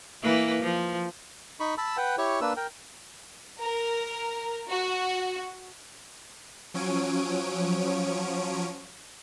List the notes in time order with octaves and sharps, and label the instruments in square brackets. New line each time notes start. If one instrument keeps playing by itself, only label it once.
[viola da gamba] E3 A#3 B4
F3
[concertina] D#4 B5 C#6
A5 B5 E6
B4 F#5 G5
E4 G4 C#5 C#6
A#3 D4 B4 E6
A#4 G5
[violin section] A#4
F#4
[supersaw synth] F3 F#3 C#4 C#5 D7 D#7